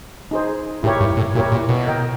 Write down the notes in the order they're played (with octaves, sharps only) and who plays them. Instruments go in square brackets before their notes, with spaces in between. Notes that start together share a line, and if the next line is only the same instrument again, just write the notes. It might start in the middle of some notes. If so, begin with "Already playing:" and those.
[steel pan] D#4 G#4 C5
[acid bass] A2 [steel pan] E4 G4 A#4 C#5
[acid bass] G2
A2
[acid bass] A#2 [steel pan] E4 G4 A#4 C#5
[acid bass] A#2
B2
[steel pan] A#4 D#5 G5